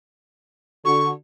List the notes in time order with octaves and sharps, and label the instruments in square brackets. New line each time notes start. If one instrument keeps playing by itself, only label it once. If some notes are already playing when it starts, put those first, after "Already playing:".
[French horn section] D3 F#4 [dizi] C#6